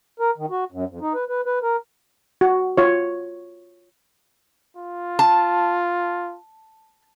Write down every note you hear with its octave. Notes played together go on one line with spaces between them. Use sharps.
A#4
D#3
F#4
F#2
F2
D#4
B4
B4
B4
A#4
F#4
F4 C#5
F4
A5